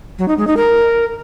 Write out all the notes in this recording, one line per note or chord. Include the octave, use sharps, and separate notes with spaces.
F#3
D#4
G#3
D#4
A#4